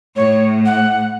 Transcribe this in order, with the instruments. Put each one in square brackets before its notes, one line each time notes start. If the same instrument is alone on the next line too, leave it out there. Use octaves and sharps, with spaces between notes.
[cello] A2 [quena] C#5
[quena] F#5